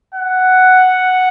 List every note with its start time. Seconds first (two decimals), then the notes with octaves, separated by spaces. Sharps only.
0.15 F#5